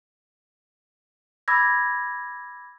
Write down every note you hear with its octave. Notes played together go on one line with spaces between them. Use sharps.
B5 D6 E6 G#6 A#6